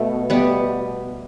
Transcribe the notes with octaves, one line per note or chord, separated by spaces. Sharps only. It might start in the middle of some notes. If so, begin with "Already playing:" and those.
Already playing: B2 A3
G3 B3